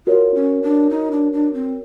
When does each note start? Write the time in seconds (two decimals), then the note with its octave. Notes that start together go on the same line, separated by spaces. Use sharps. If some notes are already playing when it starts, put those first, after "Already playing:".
0.07 F4 F#4 A#4 C#5
0.35 C#4
0.63 D4
0.90 D#4
1.11 D4
1.33 D4
1.53 C4